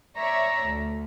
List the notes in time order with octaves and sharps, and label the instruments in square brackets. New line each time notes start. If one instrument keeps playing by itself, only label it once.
[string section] C#5 D5 E5 [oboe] A#5
[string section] D2